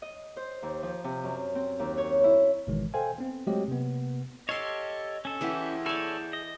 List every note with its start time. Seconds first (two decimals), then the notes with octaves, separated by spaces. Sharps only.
0.02 D#5
0.37 C5
0.62 D#2
0.83 F3
1.04 C3
1.24 F#2
1.55 C4
1.79 D#2
1.98 C#5
2.24 E4
2.67 G#1 B2 D#3 E3 G#3
2.94 A4 C5 D#5 F5 G5 G#5
3.18 B3 C4
3.47 F#3 G#3 A3 C4 G4 D#5
3.68 C3 A#3 B3
4.49 G4 A4 C#5 D#5 F5 C6
5.25 C#4 A4
5.41 E3 E4 G4 G#4 F#5
5.86 E4 A4 C#5 D5 G#5
6.33 D#5